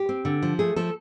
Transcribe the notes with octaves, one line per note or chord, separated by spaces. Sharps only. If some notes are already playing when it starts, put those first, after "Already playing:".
Already playing: G4
C4
D3
F3
A3 G#4
F3 A4